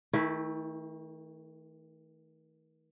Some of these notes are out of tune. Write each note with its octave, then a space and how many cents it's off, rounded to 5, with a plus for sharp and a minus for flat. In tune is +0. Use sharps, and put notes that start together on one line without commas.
D#3 +40 A3 +0 E4 +0